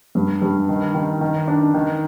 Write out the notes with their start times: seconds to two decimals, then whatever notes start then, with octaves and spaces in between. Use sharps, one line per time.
0.15 G2
0.42 G2
0.69 D#3
0.95 D#3
1.21 D#3
1.47 D4
1.74 D#3